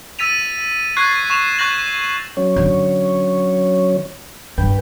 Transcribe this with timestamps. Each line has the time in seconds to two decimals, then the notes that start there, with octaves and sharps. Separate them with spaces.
0.19 E6 A6 B6 D#7 F7
0.97 C#6 F#6 G#6 A6 C7
1.30 C#6 E7 F7
1.59 C#6 F#6 G6 A#6 F#7
2.37 F#3 C#4 C#5
2.56 D3
4.58 G2 B4 G5